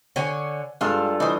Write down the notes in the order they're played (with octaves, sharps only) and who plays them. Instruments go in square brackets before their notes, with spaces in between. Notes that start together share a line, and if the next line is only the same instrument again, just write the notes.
[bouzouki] D3 C#5 G#5
[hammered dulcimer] G2 F4 A4 [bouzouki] G#3 F5
[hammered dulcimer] E3 [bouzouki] D#4 C5